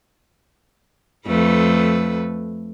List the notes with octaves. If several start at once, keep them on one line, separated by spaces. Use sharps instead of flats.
F2 A3 B4